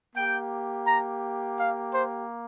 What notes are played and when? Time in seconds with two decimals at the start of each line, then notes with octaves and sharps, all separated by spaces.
0.16 A#3 G4 G5
0.87 A#5
1.58 F5
1.93 C5